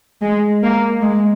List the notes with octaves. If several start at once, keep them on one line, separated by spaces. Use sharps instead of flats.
G#3
A#3
G#3